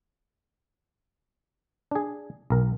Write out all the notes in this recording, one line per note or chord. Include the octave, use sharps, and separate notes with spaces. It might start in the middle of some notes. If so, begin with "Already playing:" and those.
D4 G#4
B1 A#4